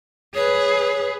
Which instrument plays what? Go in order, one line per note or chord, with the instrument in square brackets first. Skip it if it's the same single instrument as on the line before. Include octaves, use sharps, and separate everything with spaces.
[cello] G#4 B4 [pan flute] C#5